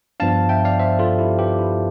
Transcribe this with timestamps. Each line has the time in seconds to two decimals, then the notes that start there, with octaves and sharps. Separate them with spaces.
0.20 G2 F3 B3 D4 F5 A5
0.49 E5 G5
0.65 D5 F5
0.79 C5 E5
0.99 F4 A4
1.18 E4 G4
1.38 G4 B4
1.59 E4